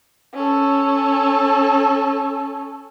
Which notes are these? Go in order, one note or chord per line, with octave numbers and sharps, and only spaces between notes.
C#4 A4